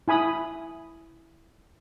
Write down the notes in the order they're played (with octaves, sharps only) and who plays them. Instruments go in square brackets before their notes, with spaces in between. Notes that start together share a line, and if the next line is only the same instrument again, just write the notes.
[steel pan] E4 G#5 B5 D#6